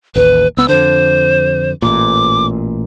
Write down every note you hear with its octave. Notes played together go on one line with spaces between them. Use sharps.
A1 D#2 B4
C#2 B3 E6
F2 D3 C5
A1 A#2 D6